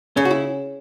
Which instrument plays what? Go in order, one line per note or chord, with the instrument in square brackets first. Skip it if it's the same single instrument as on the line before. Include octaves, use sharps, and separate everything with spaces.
[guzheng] C#3 [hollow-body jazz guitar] C#4
[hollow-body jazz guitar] F#4
E4